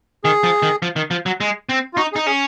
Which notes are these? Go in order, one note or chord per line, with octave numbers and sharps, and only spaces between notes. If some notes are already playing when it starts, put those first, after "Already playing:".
D#3 G#4
F3
D#3
F3
D#3
F3
F#3
G#3
C4
F4
D#4 F#4
G#4
D#4
C#4 G#4